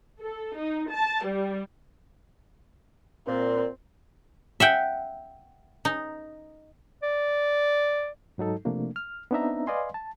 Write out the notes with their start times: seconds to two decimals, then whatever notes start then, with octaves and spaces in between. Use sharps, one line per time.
0.20 A4
0.58 D#4
0.92 A5
1.25 G3
3.27 A#2 C4
4.60 E5 F#5 G5
5.85 D#4
7.03 D5
8.38 G#2 F#3 D#4 A4
8.65 C3 F3 A3 A#3 D4
8.96 F6
9.31 B3 C4 D4 D#4 E5 A#5
9.67 B4 D5 D#5 F5 G#5 C6
9.94 A5